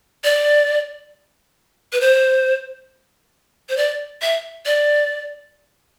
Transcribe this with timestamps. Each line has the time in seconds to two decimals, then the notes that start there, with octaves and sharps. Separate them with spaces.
0.24 D5
1.93 B4
2.01 C5
3.69 C5
3.77 D5
4.22 E5
4.66 D5